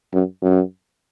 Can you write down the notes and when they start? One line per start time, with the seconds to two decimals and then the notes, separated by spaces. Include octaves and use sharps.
0.13 F#2
0.42 F#2